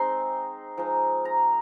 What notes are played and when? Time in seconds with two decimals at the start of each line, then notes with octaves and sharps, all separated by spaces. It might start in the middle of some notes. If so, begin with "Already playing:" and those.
Already playing: G#3 C4 D#4 C6
0.77 F3 G#3 D#4
1.25 A#5